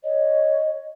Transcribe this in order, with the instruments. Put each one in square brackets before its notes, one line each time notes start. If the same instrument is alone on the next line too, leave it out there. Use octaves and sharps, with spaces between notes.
[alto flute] C#5 [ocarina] D#5